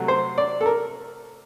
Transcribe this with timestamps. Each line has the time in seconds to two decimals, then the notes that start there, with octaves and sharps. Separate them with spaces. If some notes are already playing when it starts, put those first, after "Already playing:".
Already playing: C3 F#3 A3
0.08 C5
0.38 D5
0.61 A4
0.66 A#4